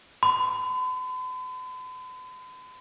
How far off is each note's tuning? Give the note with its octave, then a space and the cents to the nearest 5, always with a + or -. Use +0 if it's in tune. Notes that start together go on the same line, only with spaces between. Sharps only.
B5 +45